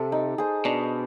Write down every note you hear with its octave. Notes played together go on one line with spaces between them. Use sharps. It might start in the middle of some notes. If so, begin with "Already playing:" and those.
Already playing: C3 A4
D#4
G#4 C5
B2 D4